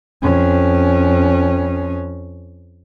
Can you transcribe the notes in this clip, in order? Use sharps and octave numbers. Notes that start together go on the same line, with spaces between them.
F2 C#4